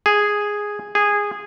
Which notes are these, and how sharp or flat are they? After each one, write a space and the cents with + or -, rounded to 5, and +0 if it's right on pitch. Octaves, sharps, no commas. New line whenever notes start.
G#4 -5
G#4 -15